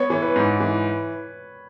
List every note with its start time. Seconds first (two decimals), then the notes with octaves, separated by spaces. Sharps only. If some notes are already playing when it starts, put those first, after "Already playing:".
Already playing: B3 C#5
0.10 E3 C#5
0.22 B4
0.36 G#2
0.60 E3